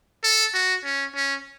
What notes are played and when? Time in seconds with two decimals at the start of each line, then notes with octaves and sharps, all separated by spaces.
0.24 A4
0.54 F#4
0.84 C#4
1.15 C#4